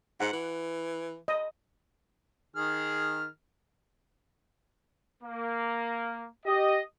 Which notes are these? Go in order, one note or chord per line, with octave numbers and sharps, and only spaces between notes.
G#2 F#5
E3
D#5
D#3 G#4 F6
A#3
G4 D#5